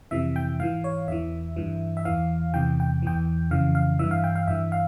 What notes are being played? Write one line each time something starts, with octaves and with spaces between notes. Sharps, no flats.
F2 C3 E3 E5
G5
G#2 E3 F5
C#5
E2 E3 E5
G2 E3
E5
E2 E3 F5
E2 C3 E3 G5
G5
E2 E3 G5
F2 C#3 E3 F5
F5
G2 E3 E5
F5
G5
F5
G2 E3 E5
F5